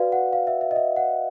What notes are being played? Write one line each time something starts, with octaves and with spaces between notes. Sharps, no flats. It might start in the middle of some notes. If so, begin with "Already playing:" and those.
Already playing: F#4 B4 D5 F5
F#5
F5
E5
E5
D#5
E5
F#5